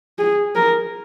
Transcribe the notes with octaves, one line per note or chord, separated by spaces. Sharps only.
G#4
A#4